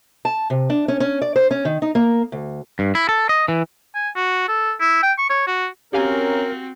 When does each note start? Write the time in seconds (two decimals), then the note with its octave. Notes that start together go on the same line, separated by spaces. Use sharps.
0.25 A5
0.50 C3
0.70 D4
0.88 C#4
1.00 C#4
1.22 D5
1.36 C5
1.51 C#4
1.65 D#3
1.82 D#4
1.95 A#3
2.32 D2
2.79 G2
2.95 E4
3.09 A4
3.29 D#5
3.48 E3
3.95 G#5
4.15 F#4
4.48 A4
4.80 E4
5.03 G5
5.18 C#6
5.30 C#5
5.47 F#4
5.93 C4 C#4 F#4 G4 A#4 F5 G#5